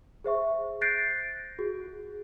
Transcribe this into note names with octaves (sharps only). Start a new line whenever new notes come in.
G#4 C5 E5 C#6
F#6 G6 A6 A#6 C7 D7
F#4 G#4